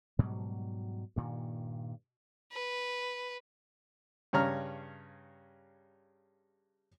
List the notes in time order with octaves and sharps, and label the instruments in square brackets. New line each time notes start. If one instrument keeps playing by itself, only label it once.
[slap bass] G#2 B2 F#3 G3
G2 A#2 D#3
[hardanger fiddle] B4
[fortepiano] G2 C#3 C#5 A#5 F6